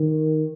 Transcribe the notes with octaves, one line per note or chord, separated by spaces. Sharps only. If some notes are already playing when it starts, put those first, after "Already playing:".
Already playing: D#3